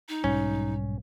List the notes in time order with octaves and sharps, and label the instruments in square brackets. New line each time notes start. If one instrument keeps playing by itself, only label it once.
[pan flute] D#4
[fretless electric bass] B1 G#2 G3 [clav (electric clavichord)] C#4